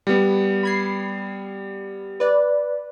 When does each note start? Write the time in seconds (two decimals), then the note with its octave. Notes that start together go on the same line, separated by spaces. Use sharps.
0.07 G3 B3
0.63 B5 G#6 C7
2.20 B4 D5